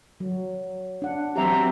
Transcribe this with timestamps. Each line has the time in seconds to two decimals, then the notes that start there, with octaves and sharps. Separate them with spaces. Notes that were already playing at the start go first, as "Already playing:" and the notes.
0.20 F#3
1.02 D4 F#5
1.36 E3 F#3 C4 G4 E5 A#5